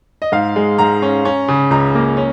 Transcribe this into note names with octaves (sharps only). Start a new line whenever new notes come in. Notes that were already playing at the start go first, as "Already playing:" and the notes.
D#5
G#2 F5
G#3
G#2 A#5
C#4
C#4
C#3
C#2 A#5
A#3
C#4